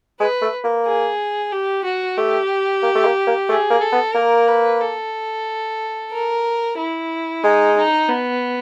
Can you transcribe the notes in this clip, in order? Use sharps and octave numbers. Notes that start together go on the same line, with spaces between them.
G#3 B4
A3
A#3
G#4
G4
F#4
A3 G4
A#3
A3
A#3
A#3
A3 G#4
A#3
A4
B3
A#3 A#4
B4
A4
A#4
E4
G#3 D#4
D#4
B3